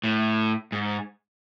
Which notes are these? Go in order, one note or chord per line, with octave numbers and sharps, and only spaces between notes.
A2
G#2